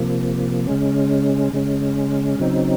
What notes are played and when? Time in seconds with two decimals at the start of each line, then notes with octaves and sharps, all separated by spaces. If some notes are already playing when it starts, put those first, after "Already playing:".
Already playing: C3 F3 A#3
0.67 C#3 G#3 C#4
1.53 C#3 G#3 C#4
2.40 C#3 F#3 C4 D#4